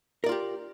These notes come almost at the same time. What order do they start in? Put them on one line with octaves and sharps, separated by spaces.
A#4 D5 F4 G4